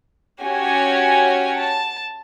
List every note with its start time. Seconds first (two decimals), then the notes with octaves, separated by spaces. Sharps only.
0.42 C#4 F#4 G4 C#5 G#5
1.60 A5